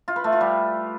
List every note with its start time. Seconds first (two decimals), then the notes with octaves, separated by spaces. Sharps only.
0.08 F4
0.16 B4
0.24 A3
0.32 F4
0.41 G3